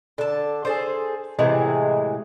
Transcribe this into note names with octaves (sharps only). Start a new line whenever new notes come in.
D3 A5
G#4 A4 C5
A2 C3 E3 G#3